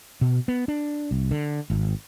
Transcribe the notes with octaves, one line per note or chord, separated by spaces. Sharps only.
B2
B3
D4
C2
D3
G#1